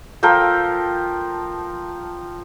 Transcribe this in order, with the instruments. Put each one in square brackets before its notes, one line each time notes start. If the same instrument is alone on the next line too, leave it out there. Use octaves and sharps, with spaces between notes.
[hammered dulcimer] F3 A4 A#4 G5